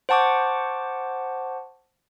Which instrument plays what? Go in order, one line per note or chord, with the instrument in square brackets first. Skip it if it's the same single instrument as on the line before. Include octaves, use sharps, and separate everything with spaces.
[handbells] C5 F#5 A5 C#6 D6